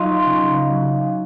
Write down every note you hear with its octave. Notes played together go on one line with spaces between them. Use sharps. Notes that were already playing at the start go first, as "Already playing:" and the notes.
Already playing: F#3 D#4 F4
C#3
F#3